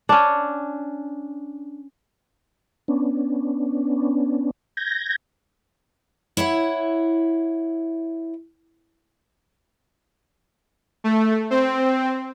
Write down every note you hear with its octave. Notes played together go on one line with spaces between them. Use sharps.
C#4 D4
B3 C#4 D4
G6 G#6 A#6
E4 C#5 E5 F#5
A3
C4